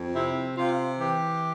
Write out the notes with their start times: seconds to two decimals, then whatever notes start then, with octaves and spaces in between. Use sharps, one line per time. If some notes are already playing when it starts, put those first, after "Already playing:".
Already playing: F2
0.14 C3 E4
0.56 C3 F4
0.97 E3 G4